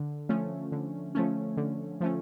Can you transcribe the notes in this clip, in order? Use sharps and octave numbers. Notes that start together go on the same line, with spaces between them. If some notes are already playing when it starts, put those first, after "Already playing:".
Already playing: D3
F3 A3 C#4
D3
F3 A3 C#4
D3
F3 A3 C#4